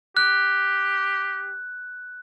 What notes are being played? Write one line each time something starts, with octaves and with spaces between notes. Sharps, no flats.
G4 F#6